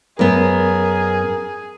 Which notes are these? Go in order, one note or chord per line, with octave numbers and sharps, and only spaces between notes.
F#2 B3 G#4 A#4